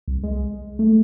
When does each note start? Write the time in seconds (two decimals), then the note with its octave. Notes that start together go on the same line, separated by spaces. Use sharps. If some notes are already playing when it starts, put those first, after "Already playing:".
0.08 C2
0.23 G#3
0.79 A3